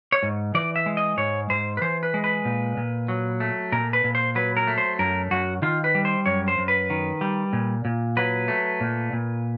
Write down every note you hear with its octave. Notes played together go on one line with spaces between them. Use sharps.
C#5
G#2
E3 D5
E5
G#3
D#5
G#2 C#5
G#2 C5
B4
E3 C5
B4
G#3
B4
A#2
A#2
F#3
A3
A#2 A#4
B4
A#2
C5
F#3 B4
A#4
A3
C5
F#2 A#4
F#2 F#4
D#3 F4
B4
G3
C5
F#2 C#5
C5
F#2
B4
D#3
G3
A#2
A#2
F#3 B4
A3
A#2
A#2